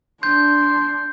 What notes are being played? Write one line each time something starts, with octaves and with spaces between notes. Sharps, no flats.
D4 C6 G6